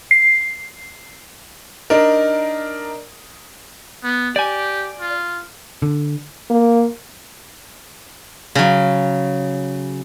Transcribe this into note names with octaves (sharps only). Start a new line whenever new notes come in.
C7
D4 D#4 A#4
B3
G4 D5 G#5
F4
D3
A#3
C#3 F#3